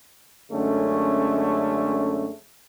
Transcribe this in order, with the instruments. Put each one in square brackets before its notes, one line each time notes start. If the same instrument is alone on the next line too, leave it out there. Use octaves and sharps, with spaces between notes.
[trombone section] F#2 D3 G#3 A3 C#4